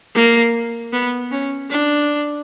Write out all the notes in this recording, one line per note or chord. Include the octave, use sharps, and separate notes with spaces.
A#3
B3
C#4
D4